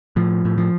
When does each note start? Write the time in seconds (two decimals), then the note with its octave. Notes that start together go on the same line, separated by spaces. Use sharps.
0.16 A2 F3
0.45 A2
0.58 F3